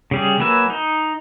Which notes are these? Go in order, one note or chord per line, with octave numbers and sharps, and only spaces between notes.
C#3 G3 G#4
F#3 A#3 B4 E5 G#5
D#4